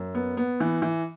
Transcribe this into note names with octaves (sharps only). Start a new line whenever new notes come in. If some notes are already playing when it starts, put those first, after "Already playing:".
Already playing: F#2
B3
B3
E3
E3